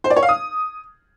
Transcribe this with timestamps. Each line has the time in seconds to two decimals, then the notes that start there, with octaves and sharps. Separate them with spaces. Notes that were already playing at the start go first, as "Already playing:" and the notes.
0.04 C5
0.10 D5
0.16 C#5
0.23 F5
0.29 D#6